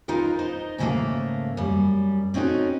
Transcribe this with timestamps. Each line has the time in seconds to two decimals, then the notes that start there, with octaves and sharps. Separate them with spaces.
0.08 D#4 F4 A#4 B4
0.39 D#4 C5 D#5
0.78 G#2 C#3 E3 G3 A3 A#3
1.57 F#2 G3
2.34 C4 C#4 D#4 F4 F#4 A4